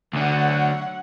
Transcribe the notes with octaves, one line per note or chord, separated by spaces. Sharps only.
D2 D3 F#3 C#5 F#5